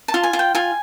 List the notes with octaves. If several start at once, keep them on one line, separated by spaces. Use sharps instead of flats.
A5
F4
G#5
F4
G5
F4 G#5